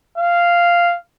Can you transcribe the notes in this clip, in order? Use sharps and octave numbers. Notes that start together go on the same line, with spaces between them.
F5